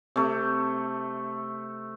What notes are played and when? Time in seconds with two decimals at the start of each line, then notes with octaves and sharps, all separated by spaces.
0.16 C3 A3